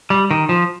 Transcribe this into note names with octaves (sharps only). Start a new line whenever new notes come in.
G3
D#3
F3